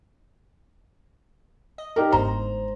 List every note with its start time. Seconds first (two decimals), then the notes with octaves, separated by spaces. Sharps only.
1.78 D#5
1.96 D#4 G4 A#4
2.12 G1 G#2 C5 A#5